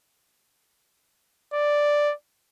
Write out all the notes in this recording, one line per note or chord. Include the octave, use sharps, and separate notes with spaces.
D5